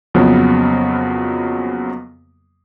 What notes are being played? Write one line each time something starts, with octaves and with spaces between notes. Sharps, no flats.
F2 C#3 F3 F#3 A#3 B3